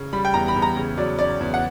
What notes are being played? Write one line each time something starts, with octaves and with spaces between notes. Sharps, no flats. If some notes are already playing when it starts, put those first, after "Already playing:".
Already playing: C#3
G3 B5
G5
E2 A#5
B5
E2
A#5
C#3
F#3 D5
C#4 D5
E2
F#5